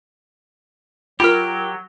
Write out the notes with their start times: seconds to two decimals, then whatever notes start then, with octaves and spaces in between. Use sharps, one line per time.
1.20 F#3 F4 G4 A#4 B5 F6